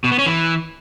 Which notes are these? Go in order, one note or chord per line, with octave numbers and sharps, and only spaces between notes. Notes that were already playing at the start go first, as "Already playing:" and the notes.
B2
B3
C#4
E3